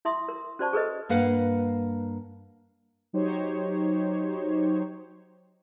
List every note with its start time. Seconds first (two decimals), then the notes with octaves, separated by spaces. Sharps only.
0.05 E4 E5 C6 D#6
0.28 A#4
0.59 C#4 F#4 C5 D5 A5 C#6
0.73 G#4 A4 B4 D#5
1.09 G2 A#3 B4 F5 F#5
3.13 F#3 D#4 G4 C5 C#5